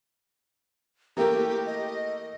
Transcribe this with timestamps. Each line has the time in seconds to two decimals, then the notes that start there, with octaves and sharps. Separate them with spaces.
1.17 E3 A3 A#3 G4 A#4 A#5
1.66 D#5